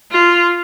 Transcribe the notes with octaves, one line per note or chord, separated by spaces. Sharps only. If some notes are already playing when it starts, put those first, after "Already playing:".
F4